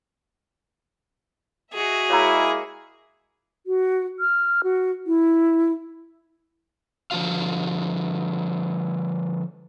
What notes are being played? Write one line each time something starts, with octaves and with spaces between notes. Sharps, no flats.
F#4 G#4 D#5 E5
G#3 A#3 E4 C#5 A#5
F#4
F6
F#4
E4
D3 F3 E4 F#4 F5